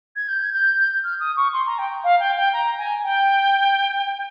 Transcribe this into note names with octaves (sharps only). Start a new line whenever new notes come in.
G#6
G6
G#6
G6
F6
D#6
C#6
C6
A#5
G5
F5
G5
G5
A#5
G#5
G5